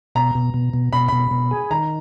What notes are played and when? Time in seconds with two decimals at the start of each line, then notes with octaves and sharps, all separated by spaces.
0.15 B2 A#5
0.35 B2
0.54 B2
0.74 B2
0.93 B2 B5
1.08 B2 B5
1.31 B2
1.51 G#4
1.71 D#3 A#5